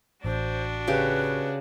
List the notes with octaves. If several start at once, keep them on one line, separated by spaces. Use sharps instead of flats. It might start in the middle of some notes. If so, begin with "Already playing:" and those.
A1 D4 F#4 C5
C#3 G4 B4